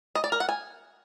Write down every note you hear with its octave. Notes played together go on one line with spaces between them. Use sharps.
D#5
D5
A#4
F#5
G#5